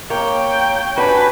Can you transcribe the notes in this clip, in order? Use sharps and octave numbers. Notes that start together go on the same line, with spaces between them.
A#3 C#5 G5
D4 F#4 B4 G#5